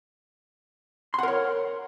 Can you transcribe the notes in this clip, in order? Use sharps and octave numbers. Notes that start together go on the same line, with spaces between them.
A#4 C#5 F#5 C6